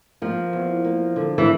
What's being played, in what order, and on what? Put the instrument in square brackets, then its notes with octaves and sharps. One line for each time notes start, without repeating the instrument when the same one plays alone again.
[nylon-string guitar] F3 [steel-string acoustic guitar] A#3
[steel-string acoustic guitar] E2
A#3
D3
[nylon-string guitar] E3